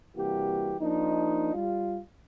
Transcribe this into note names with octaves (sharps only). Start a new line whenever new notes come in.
C3 E3 G3 A#3 F#4 G4
F3 A#3 D4 D#4
G3 F4